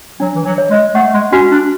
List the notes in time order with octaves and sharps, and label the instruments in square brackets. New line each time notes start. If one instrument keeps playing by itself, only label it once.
[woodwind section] F#3 [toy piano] D4
[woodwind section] E3
F#3
[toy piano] C#5
[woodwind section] G#3
[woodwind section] A3 [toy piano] F#5
[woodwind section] G#3
[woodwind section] C#4 [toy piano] F#4
[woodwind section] D4